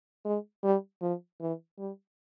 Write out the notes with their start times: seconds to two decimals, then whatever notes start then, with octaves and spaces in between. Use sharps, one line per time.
0.25 G#3
0.64 G3
1.02 F3
1.41 E3
1.78 G3